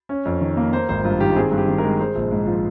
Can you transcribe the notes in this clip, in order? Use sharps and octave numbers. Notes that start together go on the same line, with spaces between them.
C#4
F2
D#3
A#3
A#3 C5
G#1 C5
G2 F4
D#3 G4
C4 G#4
G2
G4
D#3
A#4
G#3
G#3 C5
A#1
G#2
F3